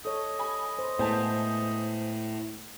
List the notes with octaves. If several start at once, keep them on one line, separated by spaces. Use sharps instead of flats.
A4 C#5 D#5
G#5 B5
C5
A2 G#3 B3 C5 G#5 A5